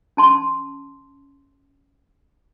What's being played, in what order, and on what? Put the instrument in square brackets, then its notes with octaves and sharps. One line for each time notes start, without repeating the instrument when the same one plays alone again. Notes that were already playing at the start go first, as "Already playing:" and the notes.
[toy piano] C#4 A5 C6